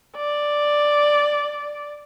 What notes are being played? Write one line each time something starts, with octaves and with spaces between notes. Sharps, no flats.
D5